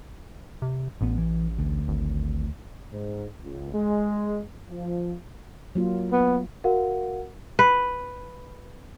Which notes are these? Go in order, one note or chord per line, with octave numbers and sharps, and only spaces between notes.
C3
A1 A2 B3
E3
D2
G#1
G#2
C#2
G#3
F3
F#3 A#3 F4
B3
F#4 A#4 F5 F#5
B4